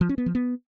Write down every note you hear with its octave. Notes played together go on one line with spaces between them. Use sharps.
F3
C#4
B3
F3
B3